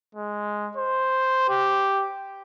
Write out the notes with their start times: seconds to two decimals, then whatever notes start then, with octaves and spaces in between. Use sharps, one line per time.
0.15 G#3
0.77 C5
1.49 G4